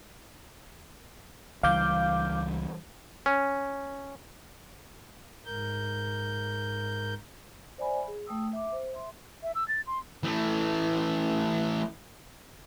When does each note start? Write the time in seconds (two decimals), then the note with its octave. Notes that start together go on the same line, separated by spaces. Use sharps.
1.63 C#2 E3 G3 F5 D6 G6
3.26 C#4
5.46 G#2 A#4 G6
7.78 C5 D5 E5 G#5 B5
8.08 G#4
8.26 A3 G5 D#6 E6
8.53 E5 D6
8.72 C5
8.94 E5 C6
9.43 E5
9.55 E6
9.68 A6
9.87 C6
10.23 E3 A3